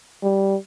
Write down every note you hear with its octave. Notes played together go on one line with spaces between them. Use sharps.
G3